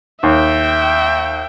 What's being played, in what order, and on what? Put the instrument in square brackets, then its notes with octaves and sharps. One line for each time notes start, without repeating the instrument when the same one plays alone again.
[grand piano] D#2 [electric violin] E5 G5